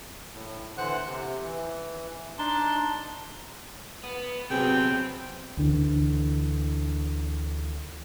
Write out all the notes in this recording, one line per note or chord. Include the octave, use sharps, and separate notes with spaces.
A2
D3 E3 C5 F#5 F#6
C3
E3
D4 D#4 A5 C6
B3
C3 F#3 B3 C4 G#4 B4 G5
D2 D3 E3